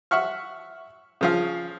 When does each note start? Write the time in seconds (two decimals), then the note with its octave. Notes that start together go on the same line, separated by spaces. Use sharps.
0.11 E5 F#5 C#6 F6
1.21 C#3 F3 F5